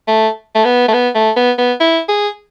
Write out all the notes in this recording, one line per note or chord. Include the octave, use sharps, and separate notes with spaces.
A3
A3
B3
A3
B3
A3
B3
B3
E4
G#4